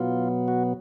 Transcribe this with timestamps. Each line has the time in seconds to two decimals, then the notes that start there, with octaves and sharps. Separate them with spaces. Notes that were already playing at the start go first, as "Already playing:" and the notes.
Already playing: B2 F#3 B3 F4
0.48 F#4